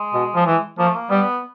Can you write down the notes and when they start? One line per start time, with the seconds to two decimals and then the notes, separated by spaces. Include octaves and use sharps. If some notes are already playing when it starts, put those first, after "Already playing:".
Already playing: G#3
0.14 B2
0.35 F3
0.47 E3
0.78 F3 A#3
0.87 A3
0.95 A#3
1.11 G3 B3